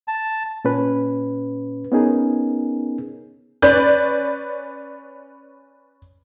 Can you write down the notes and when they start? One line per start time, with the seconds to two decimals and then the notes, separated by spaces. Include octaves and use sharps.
0.08 A5
0.65 A#2 C#4 B4
1.92 B3 C#4 D#4 G#4 A#4
3.62 C#4 B4 D5 G6